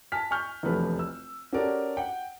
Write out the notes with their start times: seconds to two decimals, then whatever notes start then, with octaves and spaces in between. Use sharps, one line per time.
0.12 G#5 A5 F6 B6
0.31 G#5 C#6 F6 G6
0.63 F1 A#1 E2 F#3 A3 B4
0.99 E6
1.53 C#4 F#4 G4 A4 A#4 D5
1.97 F#5 G5